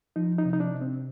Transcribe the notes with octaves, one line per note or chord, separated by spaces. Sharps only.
F3 D#4
D#4
C3
D#4
D4
C3
C4